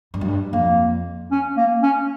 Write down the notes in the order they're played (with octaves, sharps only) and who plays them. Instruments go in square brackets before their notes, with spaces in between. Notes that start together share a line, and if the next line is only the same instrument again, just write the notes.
[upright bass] G2
F#2
G2
[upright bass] F2 [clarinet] A#3
[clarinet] C#4
A#3
C#4